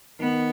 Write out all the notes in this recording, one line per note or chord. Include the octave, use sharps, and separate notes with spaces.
D#3 B3